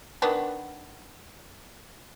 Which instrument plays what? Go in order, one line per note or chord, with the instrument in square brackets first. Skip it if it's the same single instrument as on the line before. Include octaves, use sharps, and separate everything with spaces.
[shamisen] D#3 B3 D4